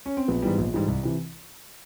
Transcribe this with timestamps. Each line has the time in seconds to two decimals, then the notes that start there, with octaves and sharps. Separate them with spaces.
0.06 C#4
0.17 C4
0.28 A#1 B3
0.42 G#2 E3 G3
0.58 A#1
0.74 G#2 E3 G3
0.88 C2
1.04 C3 E3